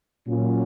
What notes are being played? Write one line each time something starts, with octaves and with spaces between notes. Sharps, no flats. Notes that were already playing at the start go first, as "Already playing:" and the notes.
A#2 F#3 C#4 F4